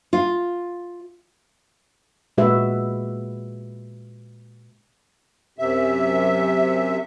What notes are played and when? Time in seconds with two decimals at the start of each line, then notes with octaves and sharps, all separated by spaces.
0.13 F4
2.38 A#2 G#3 F#4 B4 E5
5.58 F#2 C3 E5